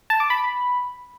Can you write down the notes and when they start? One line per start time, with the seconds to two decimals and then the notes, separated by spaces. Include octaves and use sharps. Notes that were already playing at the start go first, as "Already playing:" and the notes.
0.10 A5
0.20 D6
0.30 B5